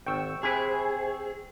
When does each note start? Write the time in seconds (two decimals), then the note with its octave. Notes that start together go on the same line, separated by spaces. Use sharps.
0.06 G#1 C5 G5 C#6 E6
0.43 C3 E4 G#4 B4